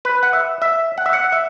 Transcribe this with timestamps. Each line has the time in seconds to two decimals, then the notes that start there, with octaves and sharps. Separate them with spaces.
0.05 B4
0.23 F#5
0.33 E5
0.62 E5
0.98 F#5
1.06 E5
1.13 F#5
1.32 E5